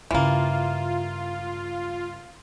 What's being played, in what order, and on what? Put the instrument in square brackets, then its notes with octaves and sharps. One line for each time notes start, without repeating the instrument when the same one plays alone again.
[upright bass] G2 C#3 [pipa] E3 A#3 [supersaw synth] F4